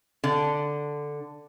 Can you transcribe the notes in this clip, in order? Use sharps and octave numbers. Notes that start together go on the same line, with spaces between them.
D3